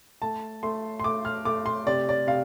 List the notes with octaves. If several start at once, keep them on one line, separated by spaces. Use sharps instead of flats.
A3 A5
A3 C6
C6
A3 D6
F6
A3 D6
C6
C3 D5
D5
C3 F5